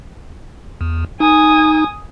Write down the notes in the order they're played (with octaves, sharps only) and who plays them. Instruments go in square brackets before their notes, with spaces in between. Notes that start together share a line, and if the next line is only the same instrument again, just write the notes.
[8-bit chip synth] E2
[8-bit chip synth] D#4 [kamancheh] G#5 D#6